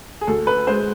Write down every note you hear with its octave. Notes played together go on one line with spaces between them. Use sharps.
G#4
D2 A4
B4
G#3 C5